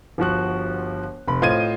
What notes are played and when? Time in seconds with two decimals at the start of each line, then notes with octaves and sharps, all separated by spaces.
0.18 G1 F3 F#4 F#6
1.27 F1 B5
1.42 A2 F4 C5 D#5 G#6 D#7